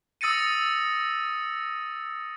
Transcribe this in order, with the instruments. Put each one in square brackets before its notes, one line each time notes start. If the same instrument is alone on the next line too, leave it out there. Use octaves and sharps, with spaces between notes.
[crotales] D#6 E6 A6 A#6 C#7 D#7